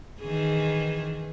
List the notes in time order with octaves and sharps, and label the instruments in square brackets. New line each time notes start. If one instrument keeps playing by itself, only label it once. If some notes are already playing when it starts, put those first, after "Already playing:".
[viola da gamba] D#3 E3 G#4